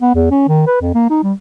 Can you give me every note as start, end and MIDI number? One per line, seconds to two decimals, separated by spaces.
0.01 0.14 59
0.15 0.29 40
0.31 0.47 61
0.48 0.66 51
0.67 0.80 71
0.82 0.93 41
0.95 1.10 58
1.10 1.23 63
1.23 1.33 55